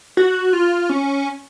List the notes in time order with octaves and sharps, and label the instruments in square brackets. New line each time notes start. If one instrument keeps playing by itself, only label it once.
[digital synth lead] F#4
F4
C#4